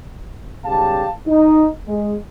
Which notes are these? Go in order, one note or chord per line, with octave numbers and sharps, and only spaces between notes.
B1 C#3 G3 G4 F5 A5
D#4
G#3